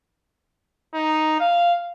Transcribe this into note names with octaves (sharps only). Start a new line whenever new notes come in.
D#4
F5